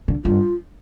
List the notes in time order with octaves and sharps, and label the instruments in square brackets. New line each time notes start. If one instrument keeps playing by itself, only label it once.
[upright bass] D3
[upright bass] G2 [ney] F4